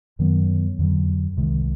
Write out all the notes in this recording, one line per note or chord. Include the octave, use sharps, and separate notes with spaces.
F#2 D#3 F#3 B3
F2 D3 F#3
C2 C3 D#3 G#3